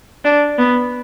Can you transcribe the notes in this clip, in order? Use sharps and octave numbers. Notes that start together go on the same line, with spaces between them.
D4
B3